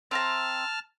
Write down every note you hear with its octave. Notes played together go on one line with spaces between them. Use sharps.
C4 E5 A5 A#5 F6